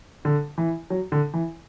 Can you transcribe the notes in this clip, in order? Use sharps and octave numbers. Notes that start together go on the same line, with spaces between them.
D3
E3
F#3
D3
E3